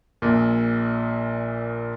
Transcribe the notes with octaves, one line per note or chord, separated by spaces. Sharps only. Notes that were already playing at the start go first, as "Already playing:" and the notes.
A#1 A#2